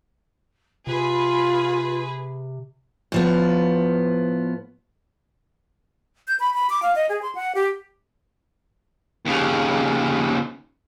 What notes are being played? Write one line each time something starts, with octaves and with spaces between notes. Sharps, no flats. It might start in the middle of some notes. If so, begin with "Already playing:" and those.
C3 F4 G#4 B4
A2 F3 B3
G6
B5
B5
D6
F5
D#5
G#4
C6
F#5
G4
D#2 C#3